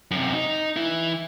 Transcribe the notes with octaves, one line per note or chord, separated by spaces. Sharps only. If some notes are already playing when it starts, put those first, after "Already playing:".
F#2 C3
D#4
E3 E4